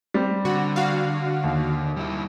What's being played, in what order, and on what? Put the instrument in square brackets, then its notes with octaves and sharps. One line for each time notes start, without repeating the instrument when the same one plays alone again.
[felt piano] G3 C4
[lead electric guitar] D3 [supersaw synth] F#4
[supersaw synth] F#4 F5
[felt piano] D#2
[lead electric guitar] G3 E4